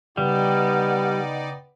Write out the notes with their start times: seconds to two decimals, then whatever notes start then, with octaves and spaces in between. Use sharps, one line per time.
0.17 C#3 G3 B3 D#4 D5 G5